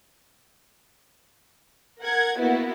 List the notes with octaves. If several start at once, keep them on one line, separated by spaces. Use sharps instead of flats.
A#4 F#5 G#6
A#3 B3 E4 F#4